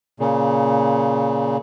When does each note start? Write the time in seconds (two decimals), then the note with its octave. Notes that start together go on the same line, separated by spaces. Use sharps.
0.20 A#2 C#3